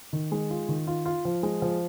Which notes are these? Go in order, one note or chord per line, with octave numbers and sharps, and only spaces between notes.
D#3
G#3
F4
D#3
F4
F4
F3
G#3
F3